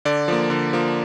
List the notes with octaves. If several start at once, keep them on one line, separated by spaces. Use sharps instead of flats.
D3 D5
F3 A#3
D3
F3 A#3